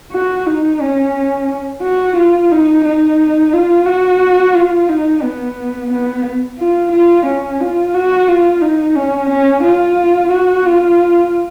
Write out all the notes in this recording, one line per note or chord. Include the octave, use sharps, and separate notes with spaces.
F#4
D#4
C#4
F#4
F4
D#4
D#4
F4
F#4
F4
D#4
B3
B3
F4
F4
C#4
F4
F#4
F4
D#4
C#4
C#4
F4
F#4
F4